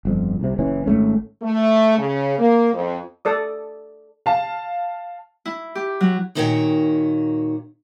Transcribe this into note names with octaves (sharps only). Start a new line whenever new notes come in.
G1 F2
C2 C3
F#1 E3 C#4
G#1 F#2 A3 C#4
A3
C#3
A#3
F2
A4 D5 D#6
F5 A5
E4
G4
F#3
D#2 A#2 D#3 F#4 C#5 G5